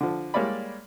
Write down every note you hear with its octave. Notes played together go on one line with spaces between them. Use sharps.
D3 F3
G3 G#3 A#3 C#5 D5 B5